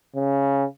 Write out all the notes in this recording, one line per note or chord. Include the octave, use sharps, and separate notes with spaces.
C#3